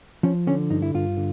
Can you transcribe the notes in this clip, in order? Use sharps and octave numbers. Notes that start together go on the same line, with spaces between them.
F3 C#4
D3 C#4
G2 D#4
E4
G2 F4
D3